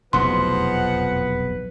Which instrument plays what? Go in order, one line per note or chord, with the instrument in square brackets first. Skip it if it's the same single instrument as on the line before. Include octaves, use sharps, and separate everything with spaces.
[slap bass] F1 B1 E2 [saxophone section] F3 D#5 F#5 [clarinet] B4 [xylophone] C6